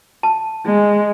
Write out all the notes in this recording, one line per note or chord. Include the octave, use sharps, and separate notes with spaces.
A5
G#3